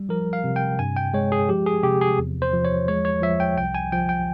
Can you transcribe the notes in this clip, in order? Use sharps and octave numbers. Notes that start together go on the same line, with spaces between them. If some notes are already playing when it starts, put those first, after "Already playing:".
Already playing: G3
F3 A#4
F5
C3
G5
G2 G#5
G5
G#3 C#5
G#4
F3 G4
G#4
C3 G4
G#4
E2
C5
F3
C#5
G#3 C#5
C#5
F3 E5
G5
C2 G5
G#5
F3 G5
G5